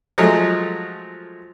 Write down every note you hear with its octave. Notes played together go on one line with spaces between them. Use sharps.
F3 F#3 G#3 A3